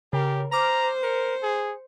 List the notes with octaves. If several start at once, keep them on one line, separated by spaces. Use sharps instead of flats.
C#3 G4 A#4
C5 A#5 D6 F6
A#4 C#7
G#4